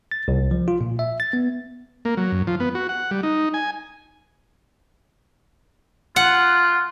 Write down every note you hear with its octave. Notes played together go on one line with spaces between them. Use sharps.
A6
C2
F3
F4
A#2
E5
A6
B3
A#3
F#3
F#2
F3
B3
F#4
F#5
G3
D#4
G#5
F4 F#5